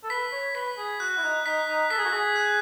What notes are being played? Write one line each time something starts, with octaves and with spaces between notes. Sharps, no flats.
A4
B4 B6
C#5
B4 B6
G#4
F#4 F#6
E4
D#4
D#4 B6
D#4
A4 B6
G#4
F#4
G#4
F#6